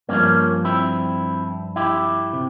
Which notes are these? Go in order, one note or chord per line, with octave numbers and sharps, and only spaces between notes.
G2 F3 A#3 C#4
C4 E4
E4 G4
C3